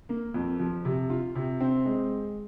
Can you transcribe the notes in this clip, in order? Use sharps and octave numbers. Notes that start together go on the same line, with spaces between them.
A#3
F2
F3
C3
F4
C3
C4
G#3